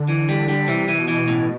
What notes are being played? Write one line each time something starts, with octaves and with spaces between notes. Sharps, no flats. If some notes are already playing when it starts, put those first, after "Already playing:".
Already playing: D3
E3
G3
G3
C3 E3
E3
B2
E3
A2